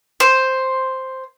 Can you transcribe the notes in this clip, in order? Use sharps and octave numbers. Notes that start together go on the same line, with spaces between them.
C5